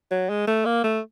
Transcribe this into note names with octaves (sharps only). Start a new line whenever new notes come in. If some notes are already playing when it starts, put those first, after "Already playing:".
F#3
G#3
A3
A#3
A3